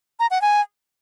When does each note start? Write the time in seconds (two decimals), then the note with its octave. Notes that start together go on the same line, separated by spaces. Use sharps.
0.20 A#5
0.31 F#5
0.42 G#5